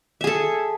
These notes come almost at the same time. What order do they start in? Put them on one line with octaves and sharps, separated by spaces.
E5 G#4 A4